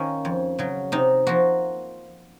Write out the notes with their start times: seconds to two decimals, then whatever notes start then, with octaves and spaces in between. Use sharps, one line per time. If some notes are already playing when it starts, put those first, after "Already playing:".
Already playing: D#3 A#3 C#4 F4
0.25 F2
0.59 C#3 F#3
0.92 C3 D#4
1.26 F3 A#3 F#4